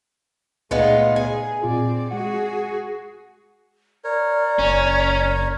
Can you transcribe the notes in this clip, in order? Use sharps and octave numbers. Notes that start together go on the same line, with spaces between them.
C#2 A#2 G#3 A3 B3 D#4 F4
G#4 G#5
A#2 C4 F4 G#4 D5
G#3 F#4 G#4 F#5
A#4 C#5 D5
F#1 C#4